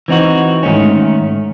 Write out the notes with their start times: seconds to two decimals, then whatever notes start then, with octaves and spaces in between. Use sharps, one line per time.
0.08 E3 C4 D#4 F#4
0.63 G#2 D#3 A3 C#4